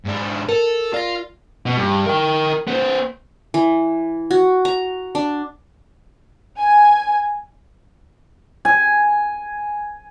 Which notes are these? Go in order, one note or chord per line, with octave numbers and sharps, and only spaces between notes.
G#2 D4
A4 A#4
F4 D5 A#6
B2
G2
A#4 G5
B3 C5
E3
F#4
A#5
D4
G#5
G#5